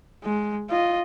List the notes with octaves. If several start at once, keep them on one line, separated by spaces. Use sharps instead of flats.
G#3
F4 D#5